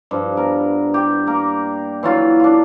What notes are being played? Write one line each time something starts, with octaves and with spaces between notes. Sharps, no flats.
G2 F3
B3 A#4
G4
A#3 A#4
E3 F#3 F4
D4 F4